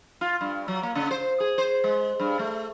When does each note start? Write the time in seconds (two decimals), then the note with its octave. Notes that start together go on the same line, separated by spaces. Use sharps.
0.21 F4
0.41 G2
0.68 F#3
0.83 A#3
0.95 C#3
1.11 C5
1.40 G#4
1.58 C5
1.84 G#3
2.20 G2
2.39 A3